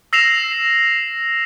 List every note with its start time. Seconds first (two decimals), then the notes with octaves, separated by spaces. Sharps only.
0.13 E6 A#6 C7 E7 F7